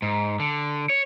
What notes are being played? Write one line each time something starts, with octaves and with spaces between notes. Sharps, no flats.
G#2
D3
C#5